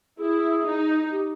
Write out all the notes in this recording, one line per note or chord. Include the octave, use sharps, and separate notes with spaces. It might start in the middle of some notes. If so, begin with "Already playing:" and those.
E4 G#4
D#4
G4